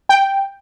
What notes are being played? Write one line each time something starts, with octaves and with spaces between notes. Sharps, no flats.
G5